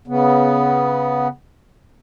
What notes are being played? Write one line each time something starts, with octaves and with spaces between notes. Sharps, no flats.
C#3 B3